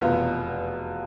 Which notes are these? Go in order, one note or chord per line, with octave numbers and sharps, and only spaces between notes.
F1 E2 B2 B3 F4